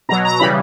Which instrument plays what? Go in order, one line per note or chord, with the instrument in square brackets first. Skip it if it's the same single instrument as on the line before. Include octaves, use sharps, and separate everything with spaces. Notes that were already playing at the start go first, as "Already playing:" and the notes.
[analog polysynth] B2 A#5
F#3
A#5
C#3 E3 G3 B5